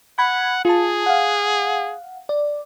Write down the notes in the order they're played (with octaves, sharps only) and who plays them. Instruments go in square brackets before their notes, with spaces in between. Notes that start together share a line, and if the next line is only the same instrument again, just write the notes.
[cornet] F#5 [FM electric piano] B5 G#6
[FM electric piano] F4 A5 [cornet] G#4
[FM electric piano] F5 F#5
D5